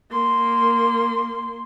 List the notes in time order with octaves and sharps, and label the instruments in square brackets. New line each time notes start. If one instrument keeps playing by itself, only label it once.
[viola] A#3 C6